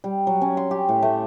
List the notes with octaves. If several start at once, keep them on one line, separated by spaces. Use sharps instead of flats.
G3
F#3
C#4
C6
G4
A2
A3